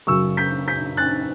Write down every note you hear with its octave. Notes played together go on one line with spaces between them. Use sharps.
F#2 C#3 F#3 C#6 E6
G6 B6
G6 B6
F#6 A6